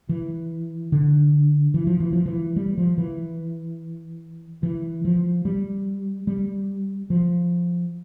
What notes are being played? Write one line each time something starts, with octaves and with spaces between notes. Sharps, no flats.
E3
D3
E3
F3
E3
F3
E3
G3
F3
E3
E3
F3
G3
G3
F3